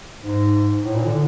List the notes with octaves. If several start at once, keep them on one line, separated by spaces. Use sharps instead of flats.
G#2
A2
A#2
D3